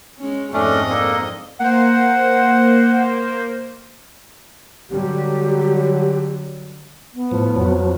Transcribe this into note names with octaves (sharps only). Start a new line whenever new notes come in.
G#3 C#4
F2 G#2 A3 C#4 D4 D#5
A#3 D4 A4
A#3 C5 F#5
D3 F#3 G3 G4
B3
A2 F3
F2 F3 F#3